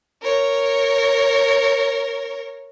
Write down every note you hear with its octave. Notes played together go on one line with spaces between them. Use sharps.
A#4 C#5